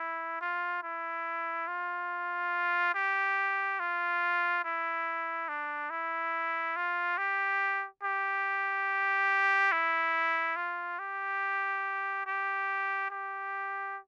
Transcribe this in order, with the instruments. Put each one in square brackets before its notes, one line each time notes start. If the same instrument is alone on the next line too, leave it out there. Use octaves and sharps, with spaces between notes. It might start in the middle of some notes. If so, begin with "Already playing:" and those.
Already playing: [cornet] E4
F4
E4
F4
G4
F4
E4
D4
E4
F4
G4
G4
E4
F4
G4
G4
G4